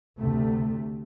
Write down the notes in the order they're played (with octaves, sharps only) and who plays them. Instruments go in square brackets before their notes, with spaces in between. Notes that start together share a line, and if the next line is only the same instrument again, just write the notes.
[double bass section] D2 C3 A3